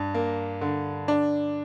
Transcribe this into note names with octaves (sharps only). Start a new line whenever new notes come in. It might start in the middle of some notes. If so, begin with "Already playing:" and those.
Already playing: G2
A#3
D3
D4